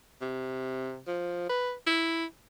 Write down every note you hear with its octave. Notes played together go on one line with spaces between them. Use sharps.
C3
F3
B4
E4